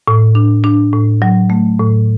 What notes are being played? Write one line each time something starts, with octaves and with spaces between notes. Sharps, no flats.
A2
D4
D4
A2
F#3
A3
A2